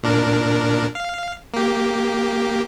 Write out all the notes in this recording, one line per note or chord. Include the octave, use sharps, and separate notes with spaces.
A#2 D4 A#4
F5
A#3 G4